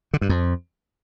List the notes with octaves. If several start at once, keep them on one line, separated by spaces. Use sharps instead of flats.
D3
G2
F2